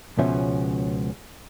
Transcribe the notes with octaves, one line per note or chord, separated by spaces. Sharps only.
C#2 B2 F3 C#4 E5